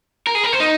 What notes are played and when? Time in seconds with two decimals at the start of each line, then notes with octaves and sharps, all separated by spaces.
0.27 A#4
0.35 G#4
0.44 A#4
0.53 C5
0.60 D#4